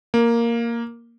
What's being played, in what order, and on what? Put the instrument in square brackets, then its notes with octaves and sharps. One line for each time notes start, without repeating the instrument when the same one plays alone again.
[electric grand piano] A#3